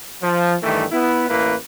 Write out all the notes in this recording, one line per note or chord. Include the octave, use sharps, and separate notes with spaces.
F3
G2 D#3 E3 A3
B3 E4
A1 A#3 E4 B4